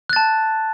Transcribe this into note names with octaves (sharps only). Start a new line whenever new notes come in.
A5 F#6 A6